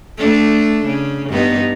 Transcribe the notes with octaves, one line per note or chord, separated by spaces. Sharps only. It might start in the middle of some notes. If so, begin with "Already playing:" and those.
A3 D4
C#3
G2 B3 D#4